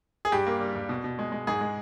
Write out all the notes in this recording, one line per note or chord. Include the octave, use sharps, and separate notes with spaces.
G#4
G2 G4
A#3
G3
G2
B2
B2
G#3
G#3
G#2 G#4
G#3